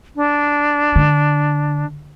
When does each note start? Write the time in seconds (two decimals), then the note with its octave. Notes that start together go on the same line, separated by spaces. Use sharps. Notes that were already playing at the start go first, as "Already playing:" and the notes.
0.16 D4
0.96 D3